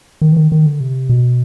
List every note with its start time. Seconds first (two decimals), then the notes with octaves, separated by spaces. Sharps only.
0.21 D#3
0.32 E3
0.37 D#3
0.52 D#3
0.66 D3
0.80 C3
1.09 B2